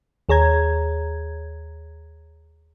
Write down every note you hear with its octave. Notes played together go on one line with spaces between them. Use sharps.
D#2 G#4 C#5 A#5 G#6